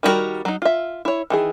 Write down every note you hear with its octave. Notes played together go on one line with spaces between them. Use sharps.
D#3 G3 B3 F#4 A#4
F#3 D#4
F4 E5
E4 C#5
D#3 E3 G#4